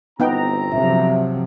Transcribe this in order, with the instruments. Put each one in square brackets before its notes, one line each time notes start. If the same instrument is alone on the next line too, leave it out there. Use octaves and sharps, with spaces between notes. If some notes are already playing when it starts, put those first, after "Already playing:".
[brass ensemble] G1 C4 A#5 [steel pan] B3 D#4 G5
[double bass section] C3 F3 F#3 [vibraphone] E5